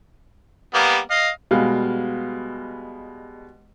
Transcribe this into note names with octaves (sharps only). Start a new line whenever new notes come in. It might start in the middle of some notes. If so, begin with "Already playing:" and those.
G3 A#3 B3
D#5 F5
B2 G3 G#3 F5